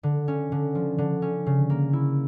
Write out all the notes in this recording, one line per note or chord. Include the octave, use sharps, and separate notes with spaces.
D3
C#4
D3
F3
D3
C#4
C#3
A#3
E4